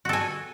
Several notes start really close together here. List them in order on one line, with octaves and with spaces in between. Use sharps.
F#4 A4 G#5